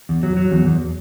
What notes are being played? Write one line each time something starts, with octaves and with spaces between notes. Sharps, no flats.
E2
F#3
F#3
E2
E2